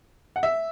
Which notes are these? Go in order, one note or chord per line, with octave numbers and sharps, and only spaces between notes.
F#5
E5